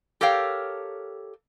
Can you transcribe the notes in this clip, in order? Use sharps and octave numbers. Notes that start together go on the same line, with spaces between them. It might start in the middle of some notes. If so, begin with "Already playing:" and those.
G4 A4 A#4 C#5 F5 G5